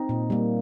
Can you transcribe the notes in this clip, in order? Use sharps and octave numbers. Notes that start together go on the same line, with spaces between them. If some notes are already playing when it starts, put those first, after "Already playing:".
Already playing: C4 D#4
A#2
G3 A#3